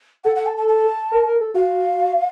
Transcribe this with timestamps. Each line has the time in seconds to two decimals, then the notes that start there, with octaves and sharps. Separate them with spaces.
0.24 A4 F#5
0.36 F#5
0.46 A5
0.57 A5
0.68 A5
1.12 A#4
1.26 A#4
1.40 A4
1.54 F#4 F5